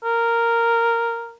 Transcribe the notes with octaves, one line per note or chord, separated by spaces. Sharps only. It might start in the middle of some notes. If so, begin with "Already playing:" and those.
A#4